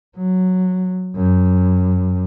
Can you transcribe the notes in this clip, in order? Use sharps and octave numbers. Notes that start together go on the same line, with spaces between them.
F#3
F#2